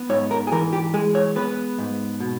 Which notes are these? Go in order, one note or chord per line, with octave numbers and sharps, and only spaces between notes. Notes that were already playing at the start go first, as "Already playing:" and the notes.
Already playing: B3
G#2 C#5
A#4
G#4
E3 A#4
G4
G#3 G#4
C#5
B3 B4
G#2
B2